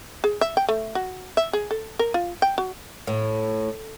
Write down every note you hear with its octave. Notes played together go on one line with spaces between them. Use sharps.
G#4
E5
G5
A3
F#4
E5
G#4
A4
A#4
F4
G5
F#4
A2